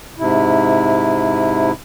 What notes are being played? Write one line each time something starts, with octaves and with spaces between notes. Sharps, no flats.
G#2 C3 E4